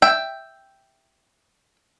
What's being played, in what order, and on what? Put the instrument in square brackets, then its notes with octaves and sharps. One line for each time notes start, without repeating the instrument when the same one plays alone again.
[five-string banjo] E5 G5